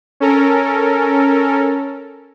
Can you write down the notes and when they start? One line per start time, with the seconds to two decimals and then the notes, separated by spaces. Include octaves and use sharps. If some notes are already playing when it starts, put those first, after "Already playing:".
0.20 C#4 A4 A#4